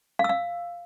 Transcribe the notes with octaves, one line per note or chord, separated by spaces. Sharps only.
F5
E6
F5